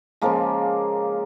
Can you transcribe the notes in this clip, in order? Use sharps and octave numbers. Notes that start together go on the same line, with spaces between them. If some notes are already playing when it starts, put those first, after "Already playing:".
C#3 F3 G#3 A#3